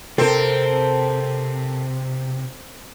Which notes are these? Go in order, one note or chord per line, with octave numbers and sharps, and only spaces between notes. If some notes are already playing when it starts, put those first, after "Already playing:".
C3 C4 A4 A#4